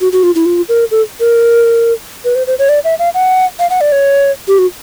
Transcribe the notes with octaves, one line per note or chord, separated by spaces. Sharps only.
F#4
F#4
F4
E4
F4
A#4
A4
A#4
B4
C5
C5
C#5
D5
E5
F5
F#5
F5
F#5
D5
C#5
G4
F#4